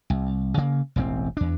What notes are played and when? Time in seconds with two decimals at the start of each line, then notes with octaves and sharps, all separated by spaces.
0.10 C2
0.57 C#3 A#3
0.96 E1 A1 C4
1.37 E2 D4